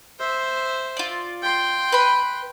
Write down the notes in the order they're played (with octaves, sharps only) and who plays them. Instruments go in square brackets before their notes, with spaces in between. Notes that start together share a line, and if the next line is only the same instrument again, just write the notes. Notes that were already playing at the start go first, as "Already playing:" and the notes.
[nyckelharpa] C5 E5
[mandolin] F4 D5
[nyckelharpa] G5 C6
[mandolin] B4 B5